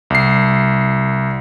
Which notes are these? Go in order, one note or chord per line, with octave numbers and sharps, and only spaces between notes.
C2 C7